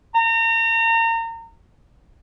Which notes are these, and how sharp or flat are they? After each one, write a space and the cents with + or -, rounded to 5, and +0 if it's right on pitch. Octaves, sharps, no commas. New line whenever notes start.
A#5 -35